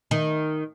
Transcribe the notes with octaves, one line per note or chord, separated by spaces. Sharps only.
D#3